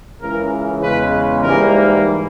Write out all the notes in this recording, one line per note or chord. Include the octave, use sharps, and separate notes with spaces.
C#2 C#3 E3 A#4
E2 C#3 G#3 B4
G#2 E3 G3 A#3 A#4